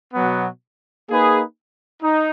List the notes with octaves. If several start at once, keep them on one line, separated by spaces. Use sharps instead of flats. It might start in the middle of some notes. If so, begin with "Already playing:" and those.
B2 F#3 B3
A#3 D#4 G#4 B4
D#4